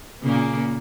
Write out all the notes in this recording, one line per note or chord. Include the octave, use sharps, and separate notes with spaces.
A#2 C#3 A#3